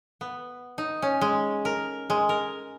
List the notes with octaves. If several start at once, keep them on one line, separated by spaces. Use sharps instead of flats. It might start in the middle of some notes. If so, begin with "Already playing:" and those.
B3
D#4
C#4
G#3
A#4
G#3
A#4